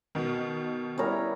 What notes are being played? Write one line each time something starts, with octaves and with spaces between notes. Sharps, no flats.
B2 D#3
G3 B3 E4 A#4 C#5